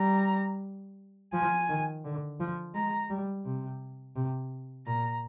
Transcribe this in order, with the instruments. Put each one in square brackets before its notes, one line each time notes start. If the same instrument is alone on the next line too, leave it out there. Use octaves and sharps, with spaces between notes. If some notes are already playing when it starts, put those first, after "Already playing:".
Already playing: [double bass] G3 [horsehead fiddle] A#5
[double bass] F3 [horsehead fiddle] G#5
[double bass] D#3
D3
F3
[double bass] G#3 [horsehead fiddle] A#5
[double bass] G3
C3
C3
[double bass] A#2 [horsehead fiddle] A#5